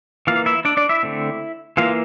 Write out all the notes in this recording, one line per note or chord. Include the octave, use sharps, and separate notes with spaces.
E3 A#3 F4 F5
E4 E5
D4 D5
D4 D5
E4 E5
D3 A3 C4
E3 A#3 F4 F5